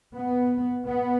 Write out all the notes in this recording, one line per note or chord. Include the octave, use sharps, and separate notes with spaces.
B3
B3